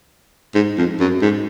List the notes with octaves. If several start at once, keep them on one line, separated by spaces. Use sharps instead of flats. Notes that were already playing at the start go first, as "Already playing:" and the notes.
G#2
F2
F#2
G#2